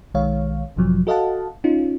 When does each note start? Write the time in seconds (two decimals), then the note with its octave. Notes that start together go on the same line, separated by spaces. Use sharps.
0.14 B1 D#3 G#3 C#5 F5
0.76 A1 G2 C3 F3 F#3
1.07 F#4 A4 D#5 F5 F#5 A5
1.64 C#4 D#4 F4